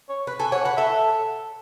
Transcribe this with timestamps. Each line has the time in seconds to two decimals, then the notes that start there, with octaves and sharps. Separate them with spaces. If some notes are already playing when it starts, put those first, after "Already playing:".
0.09 C#5
0.27 B4
0.40 A4 G#5
0.52 C#5 F#5
0.64 B4 F#5
0.77 A4 E5